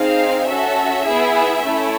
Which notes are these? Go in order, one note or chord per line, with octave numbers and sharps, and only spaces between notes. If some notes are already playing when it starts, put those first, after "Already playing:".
Already playing: C4 D#4 G#4 F5
C#4 F#4 A4 E5
B3 E4 G#4
A3 C#4 E4